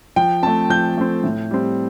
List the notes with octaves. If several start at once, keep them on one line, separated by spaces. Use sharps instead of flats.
F3 G5
A3 C4 A5
F3 G6
A3 C4
A2
G3 C4